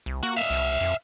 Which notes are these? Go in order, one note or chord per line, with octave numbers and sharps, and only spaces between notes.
C2
A#3 F#4
E5 F5
C2
F2